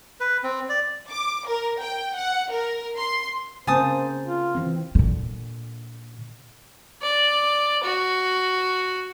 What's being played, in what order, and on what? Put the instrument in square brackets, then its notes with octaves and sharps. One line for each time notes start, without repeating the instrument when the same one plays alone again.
[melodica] B4
C4
D5
[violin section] D6
A#4
G5
F#5
A#4
C6
[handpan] C#3 A#3 C4 [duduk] C5 [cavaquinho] G#5 A5 D#6
[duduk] F4
[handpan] E3 C4
[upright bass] A#2 D3
[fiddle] D5
F#4